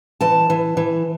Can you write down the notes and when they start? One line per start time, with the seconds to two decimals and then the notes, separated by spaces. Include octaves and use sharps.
0.21 E3 A5
0.50 E3
0.77 E3